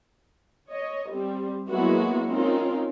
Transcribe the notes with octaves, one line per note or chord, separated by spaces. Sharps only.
C#5 D#5
G3 C4
F#3 G#3 A#3 B3 E4 F#4
C4 C#4 D#4 F4 A#4